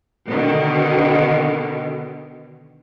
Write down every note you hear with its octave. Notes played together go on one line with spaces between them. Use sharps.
B2 D3 D#3